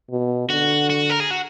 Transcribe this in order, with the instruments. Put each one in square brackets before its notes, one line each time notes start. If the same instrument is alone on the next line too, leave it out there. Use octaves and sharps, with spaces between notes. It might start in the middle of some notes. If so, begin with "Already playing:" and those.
[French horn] B2
[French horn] D3 [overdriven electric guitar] F#4
[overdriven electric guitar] F#4
A#4
G#4
F#4